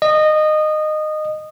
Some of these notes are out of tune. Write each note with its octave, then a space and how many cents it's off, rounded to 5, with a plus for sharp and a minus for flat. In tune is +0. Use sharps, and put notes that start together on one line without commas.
D#5 -20